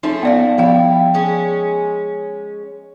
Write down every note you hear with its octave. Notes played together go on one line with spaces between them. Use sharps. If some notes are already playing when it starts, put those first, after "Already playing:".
F3 A3 C#4 D#4
B3 D5 F5
F3 G3 B3 E4 F5
G#3 C#4